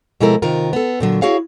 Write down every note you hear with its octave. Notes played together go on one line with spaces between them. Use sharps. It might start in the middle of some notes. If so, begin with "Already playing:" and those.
B2 F3 G#3 E4 A4 A#4
C3 D#3 F4 A#4
B3 A4
A#2 D3 F#3
E4 F#4 G#4 C#5 F5